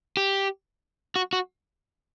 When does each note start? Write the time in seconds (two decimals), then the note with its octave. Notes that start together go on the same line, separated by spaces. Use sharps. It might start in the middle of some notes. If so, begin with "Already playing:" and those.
0.17 G4
1.16 F#4
1.33 F#4